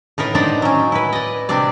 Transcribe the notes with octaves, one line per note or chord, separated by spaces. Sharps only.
A2 D#4 A#4 B4
D4 D#4 C5 D5 F#5
F#3 C#4
E4 B4
D5 D#5
C3 C4 D4 D5